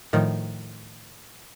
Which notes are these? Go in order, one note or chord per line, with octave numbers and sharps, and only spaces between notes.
A2 D#3 F3